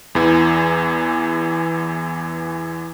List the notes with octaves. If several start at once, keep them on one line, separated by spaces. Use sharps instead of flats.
E2 E3